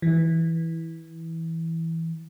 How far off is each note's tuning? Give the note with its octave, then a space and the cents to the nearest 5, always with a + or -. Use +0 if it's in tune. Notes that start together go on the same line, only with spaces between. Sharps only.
E3 -10